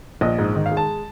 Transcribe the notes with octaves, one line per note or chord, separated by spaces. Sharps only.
A#1 D#5
G#2
D#3 D#5
F5
G#3
A5